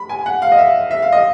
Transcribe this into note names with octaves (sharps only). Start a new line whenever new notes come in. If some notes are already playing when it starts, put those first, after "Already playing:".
Already playing: B5
G#5
F#5
F5
D#5
E5
E5
F5
D#5